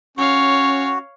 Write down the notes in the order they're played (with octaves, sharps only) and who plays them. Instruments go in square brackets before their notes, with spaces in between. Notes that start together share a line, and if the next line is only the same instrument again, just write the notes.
[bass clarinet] C#4 [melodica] F#4 [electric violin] C#5 F5